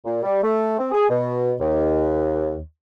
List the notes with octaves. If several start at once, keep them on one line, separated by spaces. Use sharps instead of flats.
A#2
G3
A3
C4
G#4
B2
D#2